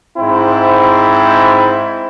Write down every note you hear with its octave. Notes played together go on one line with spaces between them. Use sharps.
G#2 C4 E4